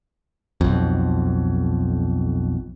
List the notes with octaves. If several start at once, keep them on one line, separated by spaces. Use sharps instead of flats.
B1 F2